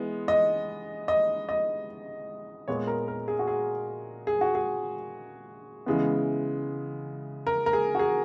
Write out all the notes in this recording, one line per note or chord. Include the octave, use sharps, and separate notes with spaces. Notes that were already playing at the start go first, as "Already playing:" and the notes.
Already playing: E3 G#3 B3
D#5
D#5
D#5
A#2 G#3 B3 C#5
A#4
A#4
G#4
F#4
G#4
G#4
F#4
G#4
C#3 E3 G#3 B3
A#4
A#4
G#4
F#4
G#4